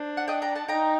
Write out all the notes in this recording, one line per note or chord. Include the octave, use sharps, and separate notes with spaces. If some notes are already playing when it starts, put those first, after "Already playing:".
Already playing: D4 C5
F#5
D#5 G5
G5 A#5
F#5 A5
D#4 G5 A#5